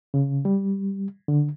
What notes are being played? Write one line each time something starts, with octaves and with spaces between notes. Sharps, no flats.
C#3
G3
D3